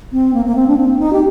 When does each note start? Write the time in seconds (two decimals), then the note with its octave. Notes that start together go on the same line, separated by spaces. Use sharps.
0.12 C4
0.34 A#3
0.46 A#3
0.55 C4
0.68 D4
0.77 C4
0.99 D#4
1.13 G4